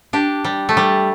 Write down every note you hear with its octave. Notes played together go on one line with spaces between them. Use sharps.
D4 G4
G3
A3
G3